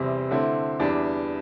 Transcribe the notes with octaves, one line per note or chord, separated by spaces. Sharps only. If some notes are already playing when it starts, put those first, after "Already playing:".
Already playing: E2 C3 G3 C4 E4
D3 A3 C4 E4
E2 E3 G3 D4